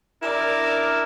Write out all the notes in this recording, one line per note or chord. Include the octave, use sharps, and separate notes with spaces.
D4 E4 A#4 D5